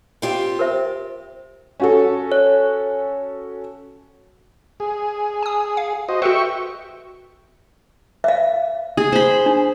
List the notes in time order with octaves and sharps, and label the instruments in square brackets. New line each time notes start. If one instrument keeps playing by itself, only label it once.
[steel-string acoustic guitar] C4 F4 G4
[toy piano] A#4 C5 E5
[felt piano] C#4 F#4 A4
[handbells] C#5
[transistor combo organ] G#4
[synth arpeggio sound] G#5 D#6
F5
[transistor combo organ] F#4 C5 D#5
[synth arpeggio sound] F#4 A4 B4 [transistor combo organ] E5 G5 C#6
[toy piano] E5 F5
[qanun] G#4
C5 B5
[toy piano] D4